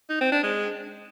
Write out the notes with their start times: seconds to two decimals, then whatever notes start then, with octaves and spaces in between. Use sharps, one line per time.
0.10 D#4
0.21 C4
0.32 D4
0.43 G#3